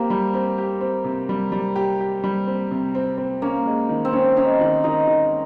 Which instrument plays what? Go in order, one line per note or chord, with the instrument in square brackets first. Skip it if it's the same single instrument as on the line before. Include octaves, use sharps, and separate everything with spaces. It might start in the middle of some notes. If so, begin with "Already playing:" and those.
Already playing: [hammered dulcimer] A#3 [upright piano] C4 G4
[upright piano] G3
C4
G4
C4
C3
G3
G3
G4
G4
G3
C4
C3
C4
C4
[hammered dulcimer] A#3 [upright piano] C#4
[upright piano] G#3
D#3
[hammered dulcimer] C4
[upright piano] C#4
[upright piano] C#4 [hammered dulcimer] D#4
[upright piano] D#3
[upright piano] D#3 [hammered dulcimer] D#4
[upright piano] D#3